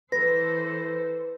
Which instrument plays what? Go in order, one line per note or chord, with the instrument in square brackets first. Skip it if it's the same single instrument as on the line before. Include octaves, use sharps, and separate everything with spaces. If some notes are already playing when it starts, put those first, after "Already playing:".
[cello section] E3 A4 C5 [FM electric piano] B4 [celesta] A#6